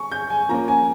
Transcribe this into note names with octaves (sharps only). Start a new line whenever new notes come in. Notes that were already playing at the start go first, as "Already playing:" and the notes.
Already playing: C#6
G6
G#5
F3 A#3 C#4 A#5
G#5